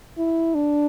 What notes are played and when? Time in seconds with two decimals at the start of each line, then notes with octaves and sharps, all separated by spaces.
0.17 E4
0.55 D4